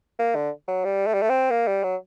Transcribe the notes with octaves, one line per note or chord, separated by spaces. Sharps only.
A#3
D3
F#3
G3
A3
G3
A3
C4
A#3
G3
F#3